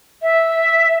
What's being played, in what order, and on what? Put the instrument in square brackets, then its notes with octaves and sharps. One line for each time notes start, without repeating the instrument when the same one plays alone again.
[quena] E5